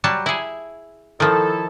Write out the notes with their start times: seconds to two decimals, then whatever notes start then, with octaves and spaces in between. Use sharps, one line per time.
0.04 F#3 G3 A5
0.26 E4 G#4
1.20 D#3 F3 E4 A4